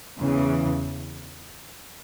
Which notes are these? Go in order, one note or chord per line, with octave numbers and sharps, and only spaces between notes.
E2 C#3 E3